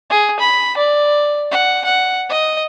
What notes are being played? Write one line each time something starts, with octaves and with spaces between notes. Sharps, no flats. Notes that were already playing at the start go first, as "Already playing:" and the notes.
G#4
B5
D5
F#5
F#5
D#5